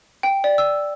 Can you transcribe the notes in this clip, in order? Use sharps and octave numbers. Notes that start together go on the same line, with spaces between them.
G5
D5
E6